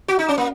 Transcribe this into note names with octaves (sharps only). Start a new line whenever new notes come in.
F#4
D#4
C#4
A#3